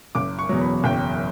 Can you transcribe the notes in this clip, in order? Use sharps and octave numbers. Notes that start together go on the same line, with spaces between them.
F#1 D6
C#6
E2 B2 F#3
B5
F#1 G5